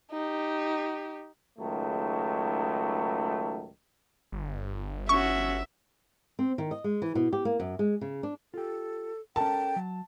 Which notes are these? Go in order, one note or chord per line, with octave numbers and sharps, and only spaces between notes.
D#4 G4
C#2 G#2 D#3 F#3 A3
G1
C#4 F#4 E5 C#6
C4
D#3
D#5
G#3
E3
B2
G4
A#3
F#2
G#3
C#3
D4
F4 G4 A4
C#4 A4 A#4 G5 A5
F#3